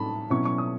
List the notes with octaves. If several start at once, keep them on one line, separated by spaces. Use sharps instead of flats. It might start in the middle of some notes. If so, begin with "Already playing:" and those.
Already playing: A2 D#4 A5 B5
B2 F#3 C#4 E4 C#6
C#6
D#6